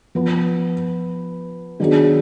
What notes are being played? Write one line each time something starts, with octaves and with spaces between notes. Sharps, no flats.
F3 B3 F4 B4
D#3 F#3 B3 D4 G#4